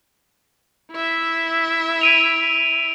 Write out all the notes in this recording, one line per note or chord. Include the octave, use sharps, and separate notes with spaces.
E4 E5
D7 D#7 F7